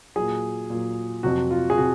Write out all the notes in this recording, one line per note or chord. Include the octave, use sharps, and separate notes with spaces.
A#2 F#3 G#4
A#2 F#3
F2 C3 F#3 F#4
F4
G#4
C3 F#4